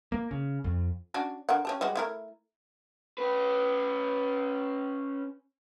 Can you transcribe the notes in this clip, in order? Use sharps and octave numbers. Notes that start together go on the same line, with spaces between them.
A#3
C#3
F2
C#4 D4 F#4
D3 A#4 F#5
C#4 G4 A5
G3 G#3 F#4
A3 E4 A#4
C#4 B4